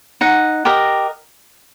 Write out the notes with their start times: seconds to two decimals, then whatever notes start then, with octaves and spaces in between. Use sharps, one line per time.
0.21 D#4 F#5
0.65 G4 A#4 D#5